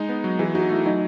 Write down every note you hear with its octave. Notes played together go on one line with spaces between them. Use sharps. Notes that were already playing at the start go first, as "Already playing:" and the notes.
Already playing: G#3 D#4
B3
F#3
E3 G#4
D#4 F#4
A3 E4
F#3 D#4